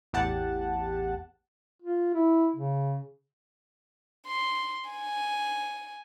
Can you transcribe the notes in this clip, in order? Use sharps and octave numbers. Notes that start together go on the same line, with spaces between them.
A1 E2 G4 F#5 A5
F4
E4
C#3
C6
G#5